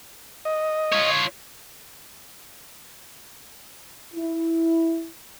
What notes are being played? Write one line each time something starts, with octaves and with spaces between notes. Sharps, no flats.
D#5
F4 C#5
E4